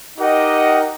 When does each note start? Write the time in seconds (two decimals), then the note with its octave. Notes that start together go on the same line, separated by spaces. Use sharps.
0.18 D#4 G4 A#4 D#5 F#5